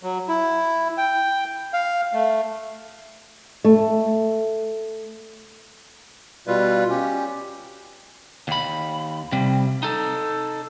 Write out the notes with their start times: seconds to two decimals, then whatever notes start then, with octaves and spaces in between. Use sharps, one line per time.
0.03 F#3
0.28 E4
0.98 G5
1.73 F5
2.13 A3
3.64 A3
6.47 B2 G3 F4 B4
6.90 C#4 G4
8.48 D#2 B5
9.32 C3 G3
9.83 D#4 A4